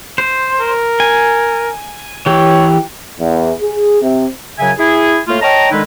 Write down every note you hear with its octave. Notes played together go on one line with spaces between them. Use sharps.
C5
A#4
G#5
E3 G4 C#5
E2
G#4
C3
F#2 C#3 F#3 E5 G#5
E4 G#4
A2 A3 A#3 F4
C#5 D#5 G5 A5 A#5
D3 D#3 G#3 D#4 E4 B4